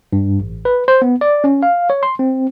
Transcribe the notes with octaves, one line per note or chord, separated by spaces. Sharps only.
G2
A1
B4
C5
B3
D5
C#4
F5
C#5
C6
C4